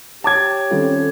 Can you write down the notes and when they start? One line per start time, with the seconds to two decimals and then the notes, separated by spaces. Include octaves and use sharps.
0.24 G4 C#5 A5 D6 G#6
0.71 D#3 G3 C4 C#4 F4 A4